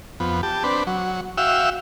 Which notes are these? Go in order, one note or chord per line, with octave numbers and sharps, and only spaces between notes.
F2 B3
G4 A5
C4 D4 B4
F#3
F#4 E5 F5 G5 E6